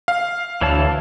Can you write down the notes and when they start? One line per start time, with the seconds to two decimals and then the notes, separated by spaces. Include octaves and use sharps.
0.08 F5
0.61 D2 E3 C#5 A5